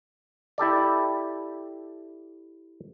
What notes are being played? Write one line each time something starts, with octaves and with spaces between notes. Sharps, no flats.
E4 G4 A4 D5